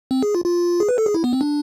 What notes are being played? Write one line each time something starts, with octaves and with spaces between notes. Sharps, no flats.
C4
G#4
F4
F4
G#4
B4
A4
G#4
E4
B3
C4
D4